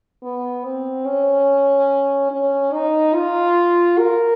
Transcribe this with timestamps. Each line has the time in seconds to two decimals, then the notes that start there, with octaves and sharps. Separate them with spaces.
0.23 B3
0.65 C4
1.06 C#4
2.31 C#4
2.74 D#4
3.15 F4
3.99 A#4